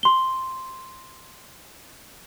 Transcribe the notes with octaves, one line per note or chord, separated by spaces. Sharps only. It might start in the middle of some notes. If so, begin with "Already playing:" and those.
C6 G7